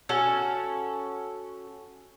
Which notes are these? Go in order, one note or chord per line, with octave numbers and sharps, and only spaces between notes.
C#4 F#4 A4